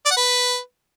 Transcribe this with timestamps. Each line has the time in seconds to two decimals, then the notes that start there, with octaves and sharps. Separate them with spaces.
0.06 D5
0.11 F#5
0.17 B4